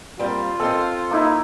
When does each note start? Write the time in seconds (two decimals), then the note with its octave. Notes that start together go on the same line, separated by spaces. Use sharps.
0.19 G3 A#3 C4 F4
0.60 C4 A4 C5 D#5
1.11 A#3 D#4 E4